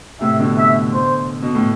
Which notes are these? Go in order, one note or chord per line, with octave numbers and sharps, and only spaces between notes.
A2 C3 E5
B2 D3
E5
C5
B2
A2